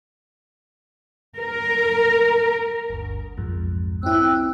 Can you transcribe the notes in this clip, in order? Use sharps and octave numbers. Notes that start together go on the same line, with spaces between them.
A#4
G1 D2
B1 F2 G#2
C4 C#4 E4 G5 E6 F#6